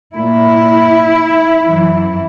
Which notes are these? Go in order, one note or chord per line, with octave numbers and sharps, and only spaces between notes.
A#2 E4
F#2 E3